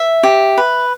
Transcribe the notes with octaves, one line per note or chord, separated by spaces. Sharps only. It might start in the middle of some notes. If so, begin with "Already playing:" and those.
Already playing: E5
G4
B4